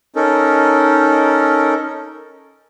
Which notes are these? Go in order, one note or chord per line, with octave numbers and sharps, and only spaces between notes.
C#4 D#4 A4 A#4